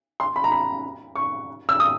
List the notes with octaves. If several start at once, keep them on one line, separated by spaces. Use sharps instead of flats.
C6
B5
A#5
B5
C#6
E6
D#6